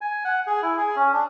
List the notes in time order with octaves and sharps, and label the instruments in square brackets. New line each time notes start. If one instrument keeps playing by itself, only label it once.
[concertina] G#5
F#5
G#4
E4
G#4
C#4
D4